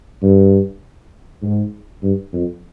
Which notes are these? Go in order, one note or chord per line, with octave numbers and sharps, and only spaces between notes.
G2
G#2
G2
F2